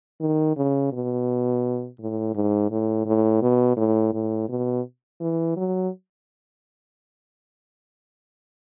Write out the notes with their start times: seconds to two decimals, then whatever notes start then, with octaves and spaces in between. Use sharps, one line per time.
0.20 D#3
0.56 C#3
0.92 B2
1.99 A2
2.35 G#2
2.71 A2
3.06 A2
3.42 B2
3.77 A2
4.13 A2
4.49 B2
5.20 E3
5.56 F#3